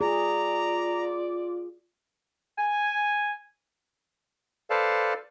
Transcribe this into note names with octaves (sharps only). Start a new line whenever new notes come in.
F4 G#4 D5 A#5
G#5
A4 B4 C5 D5 F5 A5